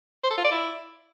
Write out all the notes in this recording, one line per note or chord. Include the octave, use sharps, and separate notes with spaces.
C5
A4
F4
D5
E4